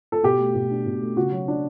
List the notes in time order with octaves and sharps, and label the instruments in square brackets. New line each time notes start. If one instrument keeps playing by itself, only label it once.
[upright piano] A4
B2 G4
A3
B2
D4
B2
A3
C#3 F#4
F#3
D4